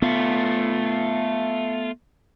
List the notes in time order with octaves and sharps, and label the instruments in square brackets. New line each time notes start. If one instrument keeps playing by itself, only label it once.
[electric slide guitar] A3 F4 [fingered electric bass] B3